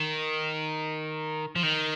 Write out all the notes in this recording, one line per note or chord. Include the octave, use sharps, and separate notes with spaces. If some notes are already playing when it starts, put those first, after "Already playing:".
Already playing: D#3
F3
D#3